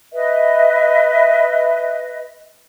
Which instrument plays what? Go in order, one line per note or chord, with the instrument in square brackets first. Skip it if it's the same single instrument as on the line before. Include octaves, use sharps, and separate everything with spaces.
[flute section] B4 D#5 E5